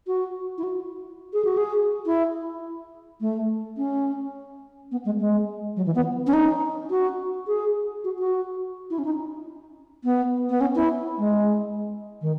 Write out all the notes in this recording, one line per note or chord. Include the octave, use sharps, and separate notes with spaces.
F#4
E4
F#4
G#4
F#4
G#4
E4
A3
C#4
B3
G#3
G#3
F#3
E3
B3
C#4
D#4
F#4
G#4
F#4
F#4
E4
C#4
D#4
B3
B3
C#4
E4
G#3
D#3